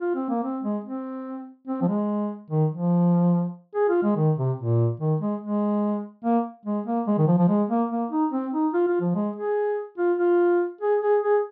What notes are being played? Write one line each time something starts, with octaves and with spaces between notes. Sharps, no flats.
F4
C4
A#3
C4
G#3
C4
C4
F3
G#3
D#3
F3
G#4
F4
G#3
D#3
C3
A#2
D#3
G#3
G#3
A#3
G#3
A#3
G#3
D#3
F3
F3
G#3
A#3
A#3
D#4
C4
D#4
F4
F4
F3
G#3
G#4
F4
F4
G#4
G#4
G#4